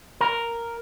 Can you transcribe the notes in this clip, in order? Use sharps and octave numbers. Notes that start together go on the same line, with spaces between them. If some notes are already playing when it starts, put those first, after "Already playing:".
A#4